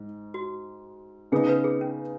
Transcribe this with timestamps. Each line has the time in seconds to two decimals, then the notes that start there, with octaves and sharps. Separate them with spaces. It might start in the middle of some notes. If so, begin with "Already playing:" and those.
Already playing: G#2
0.34 F#4
1.32 C#3 B3 D#4 G#4
1.49 B4
1.64 G#4
1.81 C#4